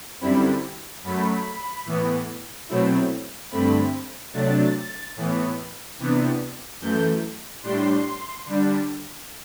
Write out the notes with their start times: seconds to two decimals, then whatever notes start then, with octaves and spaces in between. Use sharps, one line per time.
0.21 F#2 D3 G3 C4 E4 B5
1.04 F#2 F#3 A3 B5
1.86 A2 E3 B3
2.69 B2 F#3 A3 C4 E4
3.51 G2 D3 A3 C4 B5
4.33 C3 F#3 A3 D4 A6
5.16 A2 E3 B3
5.99 C3 E3 B3 D4
6.81 F#2 E3 A3 G6
7.63 A2 G3 D4 C6
8.46 D3 G3 D4